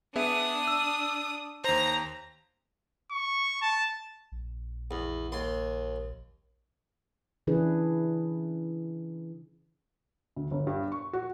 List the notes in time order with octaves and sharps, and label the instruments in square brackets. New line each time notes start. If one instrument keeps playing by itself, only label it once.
[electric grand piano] B3 G#4 E5 [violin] D4 D#6
[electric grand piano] E6
[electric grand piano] D#2 C5 [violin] A#5
[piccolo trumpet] C#6
A5
[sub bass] A#1
[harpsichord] E2
D#2 C6
[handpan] C#3 E3 D4 E4 G#4 B4
[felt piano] D2
G1
G2
C#6
F#4